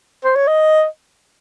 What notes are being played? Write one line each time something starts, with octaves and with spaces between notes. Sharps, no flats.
C5
C#5
D#5